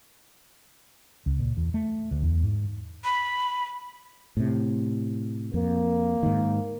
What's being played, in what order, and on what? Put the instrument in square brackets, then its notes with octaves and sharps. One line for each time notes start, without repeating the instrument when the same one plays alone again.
[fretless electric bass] C#2
A#2
E2
A3
D2
E2
G#2
[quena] B5
[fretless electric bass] A2 C3
[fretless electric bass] F2 [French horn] A#3
[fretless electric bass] G#2 D#3